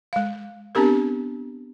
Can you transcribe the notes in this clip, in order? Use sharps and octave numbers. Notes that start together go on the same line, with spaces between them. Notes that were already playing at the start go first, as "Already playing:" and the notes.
G#3 F5
B3 C4 D4 G4 A#4